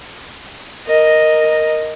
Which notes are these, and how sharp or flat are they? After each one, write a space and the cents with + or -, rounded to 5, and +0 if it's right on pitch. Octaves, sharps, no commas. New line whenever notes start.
A#4 +0 D#5 +0